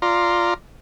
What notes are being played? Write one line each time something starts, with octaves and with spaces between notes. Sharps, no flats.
F4 D5 A#5 C6